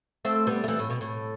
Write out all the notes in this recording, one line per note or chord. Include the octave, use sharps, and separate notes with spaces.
A3 C4
G3 B3
A3
E3 G3
A2
B2
A2